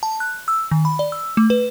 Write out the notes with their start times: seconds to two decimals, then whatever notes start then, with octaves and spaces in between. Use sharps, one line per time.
0.03 A5
0.20 F#6
0.48 E6
0.71 D#3
0.85 B5
0.99 D5
1.12 E6
1.37 A3
1.50 B4